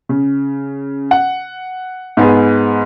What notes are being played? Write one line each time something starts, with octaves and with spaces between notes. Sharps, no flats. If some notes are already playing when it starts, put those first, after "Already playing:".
C#3
F#5
G#2 B3 G#4